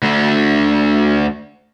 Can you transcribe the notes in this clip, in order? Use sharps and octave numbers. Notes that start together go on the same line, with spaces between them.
D2 D3